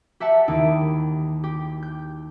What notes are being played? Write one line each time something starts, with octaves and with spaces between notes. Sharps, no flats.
G4 E5 F#5 A5
D#2 D#3 D#4 E4 D7
G4
G6